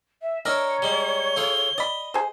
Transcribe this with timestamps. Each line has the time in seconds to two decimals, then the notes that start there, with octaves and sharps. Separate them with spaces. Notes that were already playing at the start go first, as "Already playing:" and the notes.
0.21 E5
0.45 D4 A#4 C#5 D#5 E5
0.82 G3 G#3 G7
1.36 A3 F4 G#4
1.78 D5 D#5 B5
2.14 G#4 C5